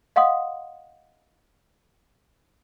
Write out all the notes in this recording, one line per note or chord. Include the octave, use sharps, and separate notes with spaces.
D#5 F5 F#5 C6 D#6